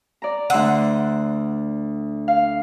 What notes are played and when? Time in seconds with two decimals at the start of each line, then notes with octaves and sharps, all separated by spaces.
0.22 D5 A#5
0.50 D2 F#5 C6 E6
2.28 F5